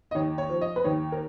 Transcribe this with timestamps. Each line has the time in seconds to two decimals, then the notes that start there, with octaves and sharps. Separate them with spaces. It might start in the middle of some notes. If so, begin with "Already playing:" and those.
0.11 D#5
0.15 D#2 C#5
0.38 C#5
0.49 F3
0.61 D#5
0.76 B4
0.84 D#2 C#5
1.12 A#4